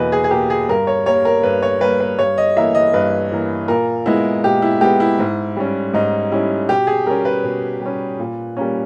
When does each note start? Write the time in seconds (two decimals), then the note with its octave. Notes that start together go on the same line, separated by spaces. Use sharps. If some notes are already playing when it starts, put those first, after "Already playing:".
Already playing: E2 B2 A#3 B4 D#5
0.12 G#4
0.24 G#4
0.31 B2 A#3 G4
0.50 G#4
0.69 G2 A#4
0.87 C#5
1.06 G3 A#3 C#5
1.25 A#4
1.43 G2 B4
1.62 C#5
1.81 G3 A#3 B4
2.00 B4
2.19 G2 C#5
2.38 D#5
2.57 E3 A#3 E5
2.75 D#5
2.94 G2 B4
3.32 E3 A#3
3.68 A#2 A#4
4.06 G#3 B3 E4
4.44 A#2 G4
4.62 E4
4.81 G#3 B3 G4
5.00 E4
5.19 G#2
5.56 G3 C#4
5.94 G#2 D#4
6.32 G3 C#4 E4
6.69 B2 G4
6.87 G#4
7.07 G3 C#4 A#4
7.25 B4
7.43 B2
7.81 G3 C#4
8.19 A#2
8.57 G3 A#3 C#4